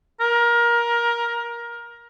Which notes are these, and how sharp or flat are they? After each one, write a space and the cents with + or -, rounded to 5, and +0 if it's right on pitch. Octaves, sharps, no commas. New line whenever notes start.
A#4 +20